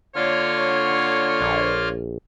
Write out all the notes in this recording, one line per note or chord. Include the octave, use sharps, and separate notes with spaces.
D3 A#3 F4 C#5 F6
A#1